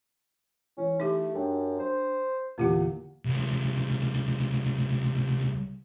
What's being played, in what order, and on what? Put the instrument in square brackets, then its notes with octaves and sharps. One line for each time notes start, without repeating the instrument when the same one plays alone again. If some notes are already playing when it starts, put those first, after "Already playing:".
[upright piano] E3 [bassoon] C#4
[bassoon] A3 [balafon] D#4 G4
[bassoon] F#2 [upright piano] D4 G5
[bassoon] C5
[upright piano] E2 A#2 [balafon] D3 G4 F#5
[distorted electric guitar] C2 C#3